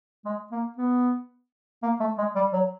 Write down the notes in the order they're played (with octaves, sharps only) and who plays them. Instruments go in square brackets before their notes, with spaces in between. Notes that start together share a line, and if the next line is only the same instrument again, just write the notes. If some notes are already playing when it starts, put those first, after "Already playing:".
[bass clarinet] G#3
A#3
B3
A#3
A3
G#3
G3
F#3